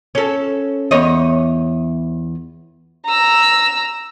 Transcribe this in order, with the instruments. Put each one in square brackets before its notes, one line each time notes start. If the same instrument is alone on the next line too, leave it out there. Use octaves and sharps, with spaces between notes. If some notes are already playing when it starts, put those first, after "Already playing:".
[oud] C#4 A4
E2 C#5 D#5
[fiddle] A#5 E6